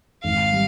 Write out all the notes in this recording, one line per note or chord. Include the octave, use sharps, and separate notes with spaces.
G#1 F5
G3